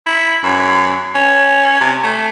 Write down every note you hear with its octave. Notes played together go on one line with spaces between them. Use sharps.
E4
F#2
C#4
C3
A3